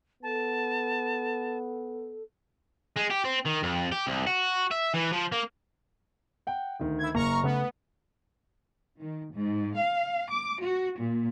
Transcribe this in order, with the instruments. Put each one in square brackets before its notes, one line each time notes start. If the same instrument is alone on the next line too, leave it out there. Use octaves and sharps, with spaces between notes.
[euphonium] B3 [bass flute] A4 [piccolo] A5
[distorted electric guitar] G#3
G4
C4
D#3
F2
G4
C2
F#4
E5
E3
F3
A#3
[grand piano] F#5 G5
D2 D#3
[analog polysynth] E4 G#6
[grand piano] F#1 [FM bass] A#3 [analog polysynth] A#5 C#6 F6
[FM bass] C#3 [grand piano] A3 [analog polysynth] B3
[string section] D#3
G#2
F5
D6
F#4
A#2